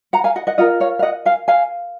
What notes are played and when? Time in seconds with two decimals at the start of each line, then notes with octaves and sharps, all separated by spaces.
0.13 F#5 A#5
0.24 F5 G#5
0.36 D#5 F#5
0.47 D#5 F#5
0.58 F4 A#4 D#5 F#5
0.80 C#5 F5
0.99 F5
1.02 D#5 F#5
1.26 F5 G#5
1.48 F5 G#5